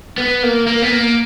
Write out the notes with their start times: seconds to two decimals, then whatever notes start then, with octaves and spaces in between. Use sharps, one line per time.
0.18 B3
0.43 A#3
0.67 A#3
0.82 B3
0.92 A#3